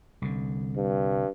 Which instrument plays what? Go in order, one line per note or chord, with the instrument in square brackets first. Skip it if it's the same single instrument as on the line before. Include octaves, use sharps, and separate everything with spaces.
[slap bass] C2 D3
[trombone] G2